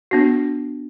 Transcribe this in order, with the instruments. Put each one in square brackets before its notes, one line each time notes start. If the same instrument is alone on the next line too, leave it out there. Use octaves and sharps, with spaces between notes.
[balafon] B3 D4 F#4